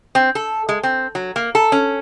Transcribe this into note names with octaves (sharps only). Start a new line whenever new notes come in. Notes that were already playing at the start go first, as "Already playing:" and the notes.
C4
A4
G#3
C4
F#3
A#3
A4
C#4